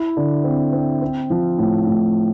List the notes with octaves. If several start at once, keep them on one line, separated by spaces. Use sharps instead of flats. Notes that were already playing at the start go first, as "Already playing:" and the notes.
Already playing: E4
D3
C4
C4
C4
F3
A2
A2